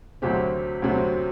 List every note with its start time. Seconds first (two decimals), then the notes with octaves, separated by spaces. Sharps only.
0.22 D2 C3 F#3 C4 G4
0.82 D2 C3 F#3 C4